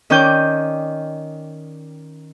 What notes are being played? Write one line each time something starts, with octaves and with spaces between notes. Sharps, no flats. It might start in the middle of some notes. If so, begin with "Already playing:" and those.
D#3 C#4 D5 G5 G6